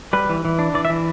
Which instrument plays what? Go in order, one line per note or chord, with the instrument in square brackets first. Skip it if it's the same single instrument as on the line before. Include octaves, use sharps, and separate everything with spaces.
[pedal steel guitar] G3 B4
E3
E3
D4
E3 D5
E5
E3